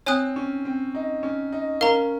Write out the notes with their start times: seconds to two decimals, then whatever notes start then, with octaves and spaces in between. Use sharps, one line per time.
0.06 C4 C#5 G#5 D#6 F#6
0.36 C#4
0.65 C4
0.95 D#4
1.23 C#4
1.52 D#4
1.81 C#4 A#4 F5 A#5